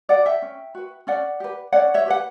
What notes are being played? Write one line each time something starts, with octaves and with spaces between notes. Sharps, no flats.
F#4 B4 D5 F#5
E5 G5
C#4
F#4 B4
C#4 D5 F#5
G4 B4
C#4 D5 F#5
C#5 E5
G4 B4 F#5